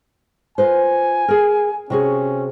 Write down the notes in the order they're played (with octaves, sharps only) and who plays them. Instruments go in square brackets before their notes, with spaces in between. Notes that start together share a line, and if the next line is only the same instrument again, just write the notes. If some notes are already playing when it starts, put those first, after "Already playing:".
[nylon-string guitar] F4 B4 C5 [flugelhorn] G#5
[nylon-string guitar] G#4 A#4
[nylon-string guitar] C3 F#4 G#4 [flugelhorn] C#4